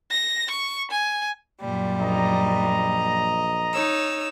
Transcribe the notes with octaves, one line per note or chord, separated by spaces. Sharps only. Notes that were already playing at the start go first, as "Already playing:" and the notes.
A#6
C#6
G#5
F#2 A#2 G3
A#1 D#5 A#5
D#4 C#5 E6